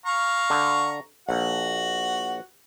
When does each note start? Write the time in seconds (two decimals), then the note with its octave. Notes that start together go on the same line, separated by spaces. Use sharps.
0.06 F5 A#5 C#6
0.50 D3
1.29 A#1 F#4 F#5